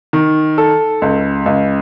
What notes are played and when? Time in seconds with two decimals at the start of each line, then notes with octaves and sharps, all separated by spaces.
0.13 D#3
0.58 A4
1.02 C#2
1.46 C#2